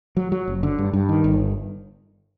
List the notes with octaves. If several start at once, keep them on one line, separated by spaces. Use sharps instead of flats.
F#3
F#3
F#1
D3
G2
G2
D#3
G1